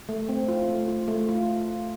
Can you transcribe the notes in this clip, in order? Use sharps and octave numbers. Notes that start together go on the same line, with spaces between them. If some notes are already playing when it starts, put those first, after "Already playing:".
A3
C4
F4
A3
F4
A3
F4